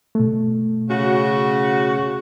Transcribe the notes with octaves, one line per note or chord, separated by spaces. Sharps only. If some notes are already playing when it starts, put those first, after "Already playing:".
B2 A3
C#3 F#4